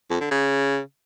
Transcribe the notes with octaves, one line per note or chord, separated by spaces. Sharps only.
F2
D3
C#3